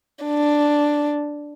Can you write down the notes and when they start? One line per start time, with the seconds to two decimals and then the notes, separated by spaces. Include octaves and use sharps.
0.25 D4